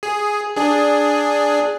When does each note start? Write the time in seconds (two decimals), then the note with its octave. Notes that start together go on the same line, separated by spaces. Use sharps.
0.03 G#4
0.56 D4 G#4